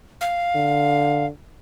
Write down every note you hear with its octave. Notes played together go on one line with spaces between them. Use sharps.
F5
D3